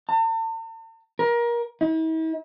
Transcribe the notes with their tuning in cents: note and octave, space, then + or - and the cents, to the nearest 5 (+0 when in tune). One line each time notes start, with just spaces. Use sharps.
A5 +45
A#4 +25
E4 -45